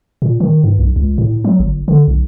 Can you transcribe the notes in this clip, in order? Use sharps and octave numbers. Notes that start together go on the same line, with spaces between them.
A#2
D#3
G2
B1
C#2
A2
F#3
G1
D3
B1